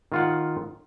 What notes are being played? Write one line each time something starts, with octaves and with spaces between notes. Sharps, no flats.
D#3 F4 F#5